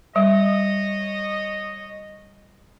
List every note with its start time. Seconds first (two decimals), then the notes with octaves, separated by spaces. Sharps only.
0.16 G3 C#5 D#5